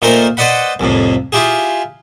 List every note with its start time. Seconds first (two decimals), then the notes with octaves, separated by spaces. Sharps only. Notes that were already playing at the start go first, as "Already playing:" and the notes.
0.02 A#2 A3 D#4 A#4 C5 C6
0.37 B4 C5 D5 D#5 F#5 B5
0.80 C2 F2 A2
1.32 E4 F4 G4 G#4